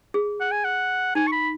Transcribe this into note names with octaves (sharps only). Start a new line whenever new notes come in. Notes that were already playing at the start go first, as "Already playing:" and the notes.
G#4
F#5
G#5
F#5
D#4 G#5
C#6
B5